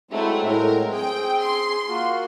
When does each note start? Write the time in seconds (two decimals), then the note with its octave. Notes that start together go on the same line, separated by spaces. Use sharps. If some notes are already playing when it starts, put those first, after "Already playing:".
0.11 F#3 G#3 A3 C4 E4
0.45 A2 A#4
0.93 C4 G#4 G5
1.42 C6
1.88 A#3 F4 F#4